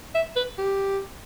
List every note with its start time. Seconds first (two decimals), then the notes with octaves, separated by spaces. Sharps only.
0.15 E5
0.36 B4
0.58 G4